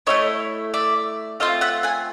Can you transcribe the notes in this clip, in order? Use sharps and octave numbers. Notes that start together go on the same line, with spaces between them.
A3 C#4 E4 C#5 D#5
D5 E5
A3 C4 F4 D#5 F5
E5 F#5
F#5 G#5